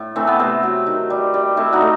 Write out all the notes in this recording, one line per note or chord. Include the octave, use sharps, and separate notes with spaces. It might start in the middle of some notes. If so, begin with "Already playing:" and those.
Already playing: A2
E3 A3 C4
B3
C3 A3 C4
F#3
D#3
G3
G3
A3 C4 E4
D#4 F#4
A3